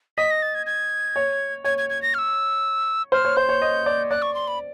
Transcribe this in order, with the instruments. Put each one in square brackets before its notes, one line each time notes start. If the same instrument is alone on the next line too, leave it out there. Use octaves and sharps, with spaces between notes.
[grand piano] D#5 [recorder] B6
[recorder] A#6
A6
G#6
G#6
[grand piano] C#5
[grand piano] C#5 [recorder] G#6
[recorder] G#6
G#6
A#6
F6
E6
[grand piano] C5 [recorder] F6
[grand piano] C#5
[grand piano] C5 [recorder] G6
[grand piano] C#5
D#5
D5
[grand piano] D5 [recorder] F#6
[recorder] C#6
C6
B5